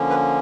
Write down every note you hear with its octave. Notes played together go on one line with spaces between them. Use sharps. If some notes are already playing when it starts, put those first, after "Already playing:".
Already playing: D3 F3 A#3 C#4
B4